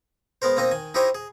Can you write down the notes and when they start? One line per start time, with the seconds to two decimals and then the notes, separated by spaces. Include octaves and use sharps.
0.42 G#3 B3 A#4 C5
0.57 A#3 C4 D#4 D#5
0.71 D#3 G#5
0.94 D#4 E4 G4 C5 C#5 D#5
1.15 G#4